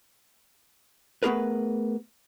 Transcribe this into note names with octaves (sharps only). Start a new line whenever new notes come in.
A3 B3 D4 G#4 A#4 B4